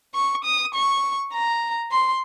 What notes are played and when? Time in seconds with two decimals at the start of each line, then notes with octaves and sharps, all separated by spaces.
0.15 C#6
0.45 D#6
0.74 C#6
1.33 A#5
1.92 C6